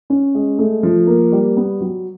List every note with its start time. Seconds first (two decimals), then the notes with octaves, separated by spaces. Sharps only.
0.10 C#4
0.35 G#3
0.59 A3
0.83 F3
1.07 A#3
1.32 G3
1.57 B3
1.81 F#3